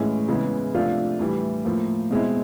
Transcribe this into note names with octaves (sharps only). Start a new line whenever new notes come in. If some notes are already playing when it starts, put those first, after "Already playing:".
Already playing: A2 E3 G#3 C#4
C#3 E3 G#3 B3 E4
C3 F3 A3 D4 F4
A2 E3 G3
A2 F3 A#3
B2 G#3 C4 E4